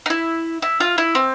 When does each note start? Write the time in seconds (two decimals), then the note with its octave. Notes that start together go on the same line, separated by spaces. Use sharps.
0.06 D#4
0.10 E4
0.62 E4
0.80 F4
0.98 E4
1.15 C4